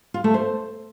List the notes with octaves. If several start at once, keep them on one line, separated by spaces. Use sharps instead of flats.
F4
A3
C5